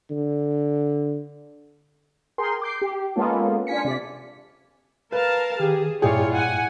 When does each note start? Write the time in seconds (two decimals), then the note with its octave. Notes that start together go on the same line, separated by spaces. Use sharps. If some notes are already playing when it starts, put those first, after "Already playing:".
0.10 D3
2.38 G#4 A#4 G5 C6
2.62 D6 G6 C7
2.82 G4
3.16 G#3 A#3 B3 C#4 F4 A4
3.67 D4 F4 G#5 B6 C#7
3.85 C3 D5 B6
5.12 A#4 B4 F5 A5
5.60 D#3 G4 G#4
6.02 G2 A#2 E4 F4 G#4 C#5 D5 G5
6.35 F#5 G#5